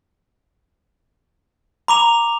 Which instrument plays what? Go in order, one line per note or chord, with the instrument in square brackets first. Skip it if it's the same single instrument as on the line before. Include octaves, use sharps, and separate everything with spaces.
[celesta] A#5 [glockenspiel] B5 D6 F7